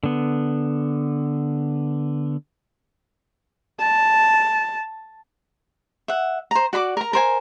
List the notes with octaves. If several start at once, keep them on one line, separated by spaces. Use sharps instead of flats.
D3 B3
A5
E5 F#5
C5 A#5
F#4 D5 B5 D6
A#4 A#5
A#4 C5 G#5